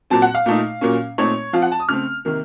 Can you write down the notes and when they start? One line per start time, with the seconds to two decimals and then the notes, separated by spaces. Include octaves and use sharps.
0.10 A#2 F#3 C4 A5
0.22 F#5
0.35 F5
0.46 A#2 A3 D#4
0.81 A#2 F#3 A#3 C#4
1.18 A#2 A3 C4 D#4 C#5
1.53 F3 C4 F4 F5
1.62 F#5
1.72 A5
1.80 D#6
1.89 C#3 A3 C4 F6
2.25 C3 D#3 A#3